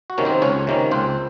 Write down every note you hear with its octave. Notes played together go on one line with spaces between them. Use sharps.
F#4
C3 D#3 A#3 C#4
C4 C5
C#2 C#4 C#5
C3 D#3 A#3 C#4
C#2 C4 C5